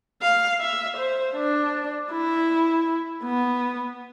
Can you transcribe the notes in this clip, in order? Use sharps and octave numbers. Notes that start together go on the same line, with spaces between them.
F5
E5
C5
D4
E4
B3